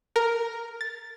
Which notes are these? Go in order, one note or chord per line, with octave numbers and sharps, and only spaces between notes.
A#4
A6